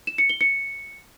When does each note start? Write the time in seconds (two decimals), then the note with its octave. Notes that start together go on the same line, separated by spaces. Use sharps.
0.07 E7
0.18 C#7
0.30 G7
0.41 C#7